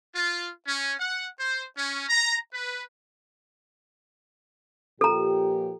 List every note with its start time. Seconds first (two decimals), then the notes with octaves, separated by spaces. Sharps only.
0.15 F4
0.66 C#4
0.99 F#5
1.39 C5
1.76 C#4
2.08 A#5
2.53 B4
5.01 A#2 F3 G4 A4 A#5